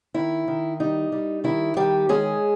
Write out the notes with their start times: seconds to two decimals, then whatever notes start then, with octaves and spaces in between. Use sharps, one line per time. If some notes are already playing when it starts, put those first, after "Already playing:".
0.14 D#3 E4
0.48 D#3
0.80 G3 D#4
1.12 G3
1.44 D#3 E4
1.76 D#3 G3 G4
2.09 G#3 C#4 G#4